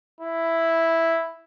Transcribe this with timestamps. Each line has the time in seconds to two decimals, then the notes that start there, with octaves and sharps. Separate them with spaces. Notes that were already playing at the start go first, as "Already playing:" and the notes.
0.21 E4